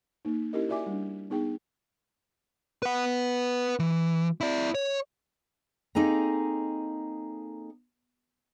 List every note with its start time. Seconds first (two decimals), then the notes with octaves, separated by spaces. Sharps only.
0.25 A#3 D#4
0.53 C#4 E4 G4 A#4 D#5
0.69 F#4 D5 E5 G#5 D6
0.86 G3 D4
1.30 B3 D#4 G#4 G5
2.83 B4 F#5
3.79 E3
4.41 E4 D5
4.75 C#5
5.95 A#3 C4 D#4 G#4 A4 A#5